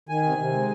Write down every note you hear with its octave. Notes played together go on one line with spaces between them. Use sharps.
D#3 G#5
C3
C3
G#3